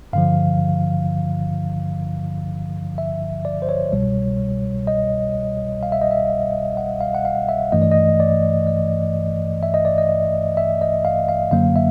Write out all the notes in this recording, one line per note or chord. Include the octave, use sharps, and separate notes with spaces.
G2 D3 F3 F5
E5
D5
C5
C#5
C2 B2 G3
D#5
F5
E5
D#5
E5
F#5
F5
F#5
F5
E5
G2 E3 A3 D#5
D5
D#5
D5
D#5
E5
D#5
D5
D#5
E5
D#5
F5
F5
F#2 D3 F#3 A#3 F5
E5